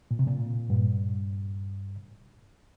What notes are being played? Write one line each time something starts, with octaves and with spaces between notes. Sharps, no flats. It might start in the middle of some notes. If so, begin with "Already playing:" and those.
A#2
C3
A#2
G2